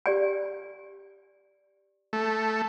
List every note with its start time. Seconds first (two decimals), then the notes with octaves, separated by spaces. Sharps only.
0.06 G4 D5 G#5
2.13 A3